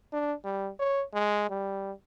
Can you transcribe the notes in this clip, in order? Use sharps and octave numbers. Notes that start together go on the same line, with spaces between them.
D4
G3
C#5
G#3
G3